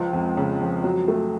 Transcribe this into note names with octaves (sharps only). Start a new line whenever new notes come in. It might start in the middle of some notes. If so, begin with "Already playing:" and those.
Already playing: C#2 F3
F2
C#3
F2
F#3
A3